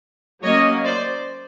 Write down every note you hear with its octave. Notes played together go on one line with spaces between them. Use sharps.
F#3 A#3 C#4 C#5 D#5
C5 D5